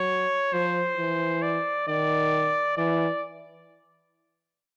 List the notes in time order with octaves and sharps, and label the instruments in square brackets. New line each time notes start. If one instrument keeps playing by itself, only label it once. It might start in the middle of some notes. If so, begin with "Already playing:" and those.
Already playing: [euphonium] F#3 [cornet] C#5
[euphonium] F3 [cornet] C5
[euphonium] E3
[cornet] D5
[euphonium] D#3 [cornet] D5
[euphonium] E3 [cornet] D5